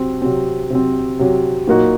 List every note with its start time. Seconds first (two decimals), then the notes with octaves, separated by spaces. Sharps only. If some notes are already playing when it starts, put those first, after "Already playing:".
Already playing: C3 F#3 C4
0.22 C3 F#3 C4
0.70 C3 F#3 C4
1.19 C3 F#3 C4
1.67 A#2 F#3 A#3 D#4 F#4